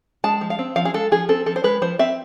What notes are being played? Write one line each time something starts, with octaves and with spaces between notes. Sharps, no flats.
G#3 A5
F3
F5
C4
F3 F5
G#4
G#3 A4
F3 G#4
C4 A4
F3 A4
C5
G#3 B4
F3 C5
C4 E5